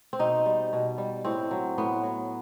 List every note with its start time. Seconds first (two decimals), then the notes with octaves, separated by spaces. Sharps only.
0.13 C4
0.19 B2 D#4
0.46 G3
0.73 B2
0.98 G3
1.25 A2 C4
1.51 F#3
1.78 A2 B3
2.03 F#3